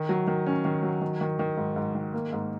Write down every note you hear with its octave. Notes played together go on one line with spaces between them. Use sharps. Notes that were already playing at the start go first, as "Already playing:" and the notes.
Already playing: D#3
F#3
D#3
C#4
D#3
F#3
D#3
D#3
D#3
G#2
G#2
D#3
A#3
G#2